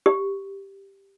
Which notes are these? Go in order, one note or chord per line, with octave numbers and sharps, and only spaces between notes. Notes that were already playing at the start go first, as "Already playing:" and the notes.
G4